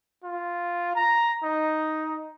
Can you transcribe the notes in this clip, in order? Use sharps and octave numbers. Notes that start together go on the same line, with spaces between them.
F4
A#5
D#4